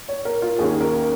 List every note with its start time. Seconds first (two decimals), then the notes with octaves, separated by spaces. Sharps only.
0.08 C#5
0.25 A#4
0.42 F4
0.58 D#2 D#3 C#4 G#4
0.81 A#4